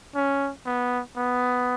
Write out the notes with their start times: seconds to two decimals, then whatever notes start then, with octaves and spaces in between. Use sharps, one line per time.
0.15 C#4
0.66 B3
1.17 B3